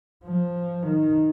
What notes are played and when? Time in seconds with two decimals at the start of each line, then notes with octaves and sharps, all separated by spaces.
0.24 F3
0.83 D#3